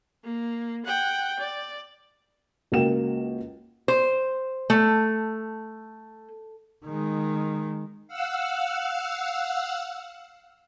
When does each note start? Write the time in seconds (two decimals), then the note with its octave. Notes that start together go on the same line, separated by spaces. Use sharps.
0.24 A#3
0.85 F#5 G5
1.39 D5
2.72 C#2 A#3 F#4 G5 E7
3.88 C5
4.70 A3
6.85 D#3 G#3
8.07 F5 F#5 E6